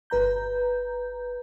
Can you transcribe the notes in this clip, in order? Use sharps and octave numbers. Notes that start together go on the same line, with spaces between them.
G1 B4 A#5 G6